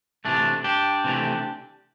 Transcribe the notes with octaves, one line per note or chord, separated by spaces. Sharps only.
C3 E3 A3 D4
D4 G4
C3 E3 A3